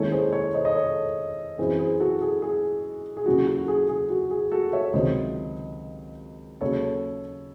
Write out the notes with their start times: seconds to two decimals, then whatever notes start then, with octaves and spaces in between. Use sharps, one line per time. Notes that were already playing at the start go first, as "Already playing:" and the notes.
Already playing: D#2 D#3 G#3 C#4 E4 A4 C#5
0.12 G#4 C5
0.32 A4 C#5
0.54 C5 D#5
0.65 D#5
0.75 A4 C#5
1.58 F#2 E3 C4 E4 G#4 C5
1.79 G#4 C5
2.00 F#4 A4
2.22 G#4
2.42 G#4
3.17 G#4
3.26 D#2 C#3 F#3 C#4 E4 F#4
3.46 F#4 A4
3.68 G#4
3.89 G#4
4.10 F#4
4.31 G#4
4.52 F#4 A4
4.73 C#5 E5
4.93 C#2 C3 D#3 F#3 C5 D#5
6.61 D#2 C#3 F#3 A4 C#5